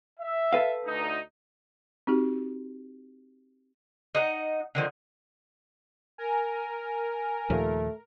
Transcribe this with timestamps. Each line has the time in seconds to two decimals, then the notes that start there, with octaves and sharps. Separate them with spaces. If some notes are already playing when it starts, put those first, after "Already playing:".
0.19 E5
0.53 A4 B4 F5
0.86 D2 D#4
2.07 C4 D#4 F#4 G4
4.15 D#4 F#5
4.75 D3 D#3 F3
6.18 A#4 G#5
7.50 D#2 A#2 F3 A3